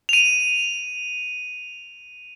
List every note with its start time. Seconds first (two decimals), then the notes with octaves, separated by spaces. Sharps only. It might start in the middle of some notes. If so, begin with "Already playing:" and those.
0.09 D#7 F7